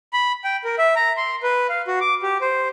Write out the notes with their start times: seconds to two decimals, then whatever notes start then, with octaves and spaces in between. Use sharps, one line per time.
0.13 B5
0.44 G5
0.64 A#4
0.78 E5
0.96 A#5
1.17 C6
1.43 B4
1.69 F5
1.87 F#4
2.01 D6
2.22 G4
2.41 C5